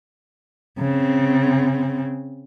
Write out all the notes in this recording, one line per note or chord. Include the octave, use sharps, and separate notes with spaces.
C#3 C4